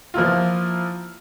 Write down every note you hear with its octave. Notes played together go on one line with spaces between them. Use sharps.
F3 A#3 E4 F4